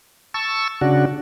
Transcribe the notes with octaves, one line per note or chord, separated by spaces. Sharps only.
A5 C#6 E6
C#3 D4 F#4